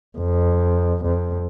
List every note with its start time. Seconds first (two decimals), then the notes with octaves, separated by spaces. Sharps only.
0.18 F2
1.04 F2